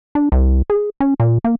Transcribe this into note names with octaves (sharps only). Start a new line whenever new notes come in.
D4
C2
G#4
C#4
A#2
A#3